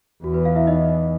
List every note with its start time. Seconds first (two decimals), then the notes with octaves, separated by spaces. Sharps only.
0.24 E2 F#4
0.34 B4
0.45 F4 F5
0.56 E4 E5
0.67 D#4 D#5
0.89 D#4 D#5